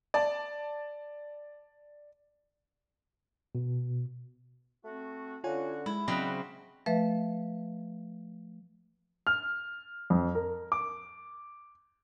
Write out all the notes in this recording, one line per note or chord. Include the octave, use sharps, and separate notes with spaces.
D5 A5
B2
A3 C4 F#4
D3 C#4 F4 F#4 C#5 G#5
G#3 E4
C#3 F#3 C4 D4 D#5 G5 B5 F#6
F3 A3 B4 E5
F6
F2
A#4
D6